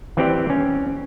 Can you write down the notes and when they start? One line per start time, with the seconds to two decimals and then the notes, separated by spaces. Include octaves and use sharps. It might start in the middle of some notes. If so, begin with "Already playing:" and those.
0.17 E3 C4 G4 D5
0.50 C#4